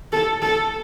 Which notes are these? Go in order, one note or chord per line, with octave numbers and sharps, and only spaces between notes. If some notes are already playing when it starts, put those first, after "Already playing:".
A4
A4